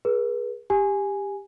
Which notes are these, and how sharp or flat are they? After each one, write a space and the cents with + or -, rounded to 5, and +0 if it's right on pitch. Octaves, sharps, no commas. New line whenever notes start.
G#4 +0 B4 -40
G4 +15 G#5 +0